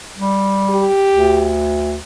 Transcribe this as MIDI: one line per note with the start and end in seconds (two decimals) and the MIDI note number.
0.17 0.87 55
0.69 1.52 67
1.11 1.96 38